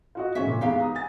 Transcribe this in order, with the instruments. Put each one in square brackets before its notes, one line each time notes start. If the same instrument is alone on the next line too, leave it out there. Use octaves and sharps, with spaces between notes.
[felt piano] F4 F#4 D#5
[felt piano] G#2 C#3 [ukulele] C#4 E5
[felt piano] A#2
[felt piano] E2 G#3 B3 [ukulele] D#4 G4 F5
[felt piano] A#5 D#6
F#5 G#5 A6